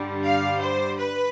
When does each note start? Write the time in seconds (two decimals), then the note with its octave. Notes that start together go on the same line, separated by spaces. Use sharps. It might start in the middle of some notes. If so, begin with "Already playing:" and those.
Already playing: G2 D3 G3
0.24 F5
0.60 C5
0.98 B4